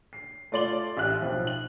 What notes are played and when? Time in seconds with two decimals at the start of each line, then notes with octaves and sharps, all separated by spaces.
0.13 C7
0.52 A3 F4 D5 C6 F#7 G7
0.97 A1 G4 E5 F#6
1.22 B1 F3
1.47 F#7